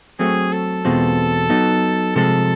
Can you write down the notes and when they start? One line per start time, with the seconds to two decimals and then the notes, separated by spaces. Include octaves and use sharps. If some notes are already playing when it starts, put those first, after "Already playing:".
0.19 F#3 A3 C4 G#4
0.52 A4
0.85 E2 B2 G#3 C4 F4
1.50 F#3 B3 D#4
2.16 C3 F3 G#3 A4